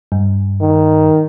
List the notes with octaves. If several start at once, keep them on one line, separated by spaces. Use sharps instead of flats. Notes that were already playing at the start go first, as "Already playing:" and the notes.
G2
D#3